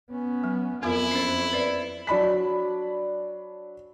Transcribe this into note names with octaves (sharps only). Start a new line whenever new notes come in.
B3 C#4
F#3
F2 B3 E4 F4 A#4
C#4 C5
B4 D5
F#3 D4 B5 B6